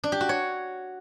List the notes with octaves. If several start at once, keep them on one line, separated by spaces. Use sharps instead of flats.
D4
G4
F#4
C#5